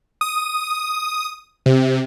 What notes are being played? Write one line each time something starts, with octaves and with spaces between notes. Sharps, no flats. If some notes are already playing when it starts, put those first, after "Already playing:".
D#6
C3